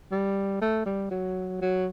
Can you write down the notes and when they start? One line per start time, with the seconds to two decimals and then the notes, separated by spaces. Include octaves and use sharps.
0.11 G3
0.61 A3
0.86 G3
1.11 F#3
1.61 F#3